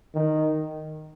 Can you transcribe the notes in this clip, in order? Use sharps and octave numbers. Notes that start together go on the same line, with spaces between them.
D#3